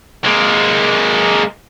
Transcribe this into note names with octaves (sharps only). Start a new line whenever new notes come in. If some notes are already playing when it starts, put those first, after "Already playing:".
G#3 A#3